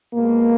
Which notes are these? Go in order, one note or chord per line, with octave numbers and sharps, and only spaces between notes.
B2 G#3 A#3